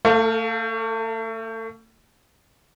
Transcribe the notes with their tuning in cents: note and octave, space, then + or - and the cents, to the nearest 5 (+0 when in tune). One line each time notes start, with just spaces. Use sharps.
A3 +35 A4 -10 F5 +0